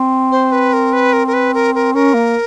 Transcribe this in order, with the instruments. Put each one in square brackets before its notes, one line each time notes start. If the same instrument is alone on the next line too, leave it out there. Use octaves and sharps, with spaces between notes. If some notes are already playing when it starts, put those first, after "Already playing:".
Already playing: [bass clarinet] C4
[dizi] C5
B4
A#4
B4
A#4
A#4
B4
A#4
A#4
[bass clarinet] C#4 [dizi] A#4
[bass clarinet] A#3